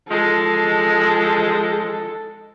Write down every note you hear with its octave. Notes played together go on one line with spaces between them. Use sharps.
F3 G#3 A4